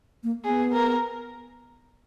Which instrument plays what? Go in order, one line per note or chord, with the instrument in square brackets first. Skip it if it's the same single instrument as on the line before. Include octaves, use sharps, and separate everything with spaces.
[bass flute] A#3
[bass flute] B3 [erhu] G#4
[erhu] A#4